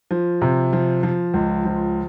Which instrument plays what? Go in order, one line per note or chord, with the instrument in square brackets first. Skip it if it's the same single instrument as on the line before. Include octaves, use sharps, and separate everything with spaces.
[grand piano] F3
C3
F3
F3
C#2
F3